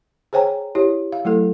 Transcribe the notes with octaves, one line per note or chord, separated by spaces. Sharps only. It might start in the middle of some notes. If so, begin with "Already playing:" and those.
G#4 C5 C#5 G5 G#5 A#5
E4 G4 C#5
F5
F#3 A3 E4 A4